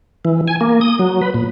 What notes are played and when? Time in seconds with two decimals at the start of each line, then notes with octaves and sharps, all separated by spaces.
0.25 E3
0.48 G#5
0.61 A#3
0.81 D#6
0.99 F#3
1.22 B4
1.34 A#2